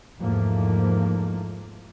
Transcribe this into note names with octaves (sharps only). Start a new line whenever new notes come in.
E2 G#2 F3 A3 A#3